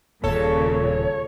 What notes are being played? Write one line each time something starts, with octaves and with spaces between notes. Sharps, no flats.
D#1 A#2 C#3 A4 C#5